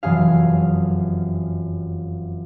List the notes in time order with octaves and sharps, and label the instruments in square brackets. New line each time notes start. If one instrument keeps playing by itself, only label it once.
[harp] F1 F#2 E3 F#3 G#4 F5